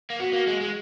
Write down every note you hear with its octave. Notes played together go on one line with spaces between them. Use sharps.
A#3
B3 F#4
A#3
G#3
G#3